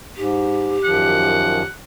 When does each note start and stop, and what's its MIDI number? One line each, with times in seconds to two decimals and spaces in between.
0.17 0.77 44
0.17 1.65 67
0.84 1.62 42
0.84 1.62 51
0.84 1.62 53
0.84 1.74 78